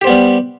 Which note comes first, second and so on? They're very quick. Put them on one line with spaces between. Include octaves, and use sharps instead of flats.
G4 C5 B3 G3